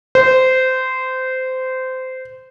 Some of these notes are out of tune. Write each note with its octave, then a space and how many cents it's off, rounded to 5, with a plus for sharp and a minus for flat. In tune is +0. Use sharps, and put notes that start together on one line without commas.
C5 -20